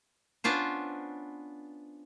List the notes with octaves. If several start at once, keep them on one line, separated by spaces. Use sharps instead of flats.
B3 C#4 D4 F4 C5